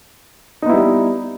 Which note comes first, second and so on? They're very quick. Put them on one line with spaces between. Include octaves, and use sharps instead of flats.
D#4 B3 E4 G3